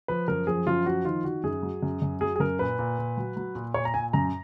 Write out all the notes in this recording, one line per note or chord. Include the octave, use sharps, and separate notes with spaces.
F3 B4
F#2 A#4
F3 G#4
F#2 F4
F3 F#4
D#3 F4
D#3 F#4
F#2 G#4
F#3
F#2
F#2
F#3 G#4
G#4
F#2 A#4
A#2 B4
A#2
A#2
F#3
F#3
A#2
A#2 C#5
A#5
A#2 G#5
F#2 A#5